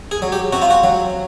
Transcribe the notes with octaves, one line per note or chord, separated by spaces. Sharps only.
G#4
F#3
G4
C3 F#4
F4
F#4
F#3